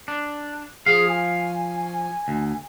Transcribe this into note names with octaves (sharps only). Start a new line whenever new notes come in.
D4
F3 G#4 F5
G#5
D2